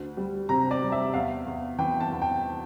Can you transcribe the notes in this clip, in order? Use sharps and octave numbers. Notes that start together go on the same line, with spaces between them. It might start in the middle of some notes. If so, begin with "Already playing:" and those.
Already playing: D2
G3
C3 A#5
D5
G3
E5
E2 F5
E2
E3 G5
A5
E2
G5